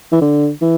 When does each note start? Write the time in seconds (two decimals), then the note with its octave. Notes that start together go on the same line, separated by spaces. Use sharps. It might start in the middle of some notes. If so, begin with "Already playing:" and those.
0.12 E3
0.22 D3
0.62 E3